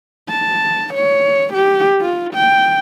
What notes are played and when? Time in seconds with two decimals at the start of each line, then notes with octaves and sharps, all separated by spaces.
0.30 A5
0.94 C#5
1.54 G4
2.01 F4
2.34 G5